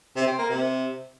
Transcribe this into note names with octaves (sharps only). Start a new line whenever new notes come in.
C3
C4
A#3
C3